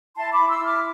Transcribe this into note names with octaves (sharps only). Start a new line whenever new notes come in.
E4 A5 C6
B5 D6
E4
C6 E6
E4
D6 F6